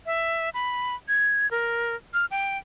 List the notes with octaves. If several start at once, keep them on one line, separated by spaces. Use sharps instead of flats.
E5
B5
G#6
A#4
F6
G5